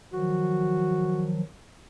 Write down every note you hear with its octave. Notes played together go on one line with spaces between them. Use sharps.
D#3 F3 F#3 F#4